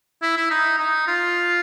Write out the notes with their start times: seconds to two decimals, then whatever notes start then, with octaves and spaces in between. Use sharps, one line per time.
0.22 E4
0.37 E4
0.50 D#4
0.78 D#4
1.07 F4